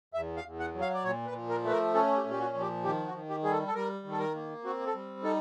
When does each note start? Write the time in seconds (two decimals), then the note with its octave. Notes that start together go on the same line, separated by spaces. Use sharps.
0.14 E2 E5
0.37 F5
0.44 E2
0.59 F#5
0.74 F#3
0.81 F5
0.94 D5
1.04 A#2 C#5
1.27 B4
1.34 F3
1.49 A#4
1.64 A3 B4
1.72 A#4
1.94 C#4 A4
2.17 G4
2.24 A#2
2.31 G4
2.40 F#4
2.54 F3
2.61 G4
2.84 D#3 G4
3.07 F#4
3.14 D#3
3.29 G4
3.44 G3 G#4
3.51 A4
3.67 A4
3.75 G3 A#4
4.04 D#3
4.11 A4
4.19 A#4
4.35 A#3
4.64 C4 F#4
4.87 A4
4.95 G3
5.23 D#4 A4